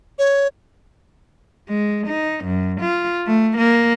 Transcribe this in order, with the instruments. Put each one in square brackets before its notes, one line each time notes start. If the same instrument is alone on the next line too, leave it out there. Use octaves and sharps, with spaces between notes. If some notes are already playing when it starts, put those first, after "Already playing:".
[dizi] C#5
[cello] G#3
D#4
F#2
F4
A3
A#3